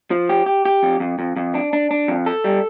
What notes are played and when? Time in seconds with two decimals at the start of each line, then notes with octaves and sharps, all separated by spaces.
0.11 F3
0.29 G4
0.46 G4
0.65 G4
0.83 F2
1.00 F2
1.19 F2
1.36 F2
1.55 D4
1.73 D4
1.91 D4
2.08 F2
2.26 A4
2.44 G3